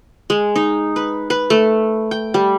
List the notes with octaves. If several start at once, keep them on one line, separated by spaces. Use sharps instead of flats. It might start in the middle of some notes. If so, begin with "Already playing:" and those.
G#3
D#4
B4
B4
A3
G5
G3